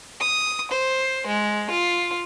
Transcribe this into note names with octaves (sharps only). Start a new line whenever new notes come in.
D#6
C5
G#3
F4